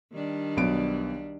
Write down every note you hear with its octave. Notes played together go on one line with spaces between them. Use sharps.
D#3 G3 D4
B1 B3 D7